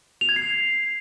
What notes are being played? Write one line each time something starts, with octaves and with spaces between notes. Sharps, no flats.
F7
G#6
C7